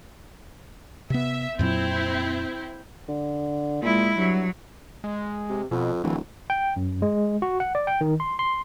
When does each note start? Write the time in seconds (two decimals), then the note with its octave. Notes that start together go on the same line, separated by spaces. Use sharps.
1.10 C3 B3 E5
1.59 F2 A#2 F#3 C4 E4 G5
3.08 D3
3.82 A#2 G#3 E4
4.17 G2 F#3
5.04 G#3
5.49 C3
5.71 F2 B2
6.04 D1 E3
6.50 G5
6.76 F#2
7.02 G#3
7.42 F#4
7.60 F#5
7.75 D5
7.87 G5
8.01 D#3
8.20 C6
8.39 C6